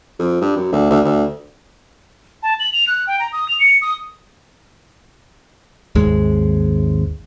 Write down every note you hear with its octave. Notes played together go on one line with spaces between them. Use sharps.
F2
G2
F#2
D2
D2
D2
A5
F#7
F7
F#6
G5
A#5
D#6
F7
C#7
D#6
G#1 D#2 G#3